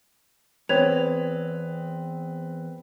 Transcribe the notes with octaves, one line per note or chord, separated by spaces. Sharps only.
E2 C4 B4 C#5 G#6 F7